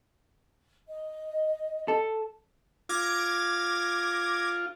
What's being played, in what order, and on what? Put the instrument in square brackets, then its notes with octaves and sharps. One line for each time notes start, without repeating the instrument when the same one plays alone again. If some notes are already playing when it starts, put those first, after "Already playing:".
[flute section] D#5
[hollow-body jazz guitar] A4
[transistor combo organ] F4 [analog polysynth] D6 G#6 A#6